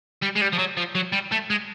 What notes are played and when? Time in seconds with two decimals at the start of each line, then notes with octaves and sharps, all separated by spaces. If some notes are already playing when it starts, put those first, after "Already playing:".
0.22 G3
0.35 G#3
0.41 G3
0.53 F3
0.59 F#3
0.77 F3
0.95 F#3
1.13 G3
1.32 A3
1.50 G#3